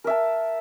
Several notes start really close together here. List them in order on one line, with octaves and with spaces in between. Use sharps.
A#4 E5 A5